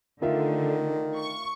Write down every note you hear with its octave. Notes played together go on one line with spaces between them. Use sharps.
D3 D#3 A3 F4 A#4 E5
C#6